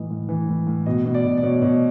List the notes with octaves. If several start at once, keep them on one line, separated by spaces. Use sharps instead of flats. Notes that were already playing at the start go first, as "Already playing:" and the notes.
Already playing: A2 E3 D#5
A2
E3
A2
A2
B2 D#5
B2
D5
B2
D5
B2 C#5
B2